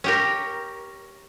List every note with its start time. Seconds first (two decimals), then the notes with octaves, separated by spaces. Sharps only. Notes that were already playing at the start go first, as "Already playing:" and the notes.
0.04 C#4 G4 A#4